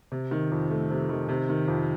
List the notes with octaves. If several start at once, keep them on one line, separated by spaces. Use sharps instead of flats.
C3
D#3
F2
A3
C3
D#3
C3
D#3
F2